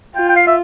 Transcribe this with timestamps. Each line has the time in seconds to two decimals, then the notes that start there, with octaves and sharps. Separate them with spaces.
0.15 F4 G5
0.29 G5
0.36 F5
0.47 E5